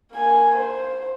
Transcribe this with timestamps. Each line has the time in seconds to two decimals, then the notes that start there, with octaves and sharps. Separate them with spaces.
0.12 A#3 G#5
0.55 C5